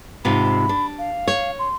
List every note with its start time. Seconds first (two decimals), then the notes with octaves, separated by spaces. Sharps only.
0.25 G#2 C3 F4 B5
0.69 D4
0.99 F5
1.28 C#5
1.59 C6